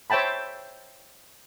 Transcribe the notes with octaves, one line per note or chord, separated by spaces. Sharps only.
C5 C#5 E5 G5 A5 B5